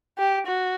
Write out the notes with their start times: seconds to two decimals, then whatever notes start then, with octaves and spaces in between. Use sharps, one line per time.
0.18 G4
0.47 F#4